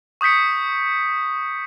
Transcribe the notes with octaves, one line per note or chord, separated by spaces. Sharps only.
C#6 D#6 G6 B6 C#7